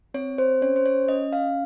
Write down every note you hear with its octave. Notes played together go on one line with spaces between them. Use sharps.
C4 C#5
C5
C#4 C#5
C5
C#5
C#4 D#5
F5